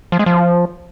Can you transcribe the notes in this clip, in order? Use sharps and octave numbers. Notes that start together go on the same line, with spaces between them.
F3
G#3
F3